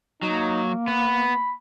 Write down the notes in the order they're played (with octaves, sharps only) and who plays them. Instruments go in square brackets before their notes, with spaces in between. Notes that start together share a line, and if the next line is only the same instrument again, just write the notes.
[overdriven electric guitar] F#3 [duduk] A#3 [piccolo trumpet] D#4
[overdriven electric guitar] B3 [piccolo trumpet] B5